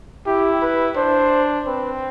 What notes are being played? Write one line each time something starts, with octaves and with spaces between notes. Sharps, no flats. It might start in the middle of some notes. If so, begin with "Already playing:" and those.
E4 G4
B4
D4 C5
C4 B4